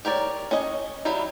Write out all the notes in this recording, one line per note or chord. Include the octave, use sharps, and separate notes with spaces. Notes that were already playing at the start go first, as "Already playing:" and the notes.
G4 A#4 C#5 D5
C#4 C#5 D#5
F#3 G3 E4 B5